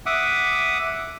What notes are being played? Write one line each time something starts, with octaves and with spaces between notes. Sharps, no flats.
E5 F#5 D6 D#6